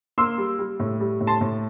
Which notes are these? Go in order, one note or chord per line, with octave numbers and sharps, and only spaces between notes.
A#3 C6 E6
G3
G3
A2
G3
A2
A5 C6
A2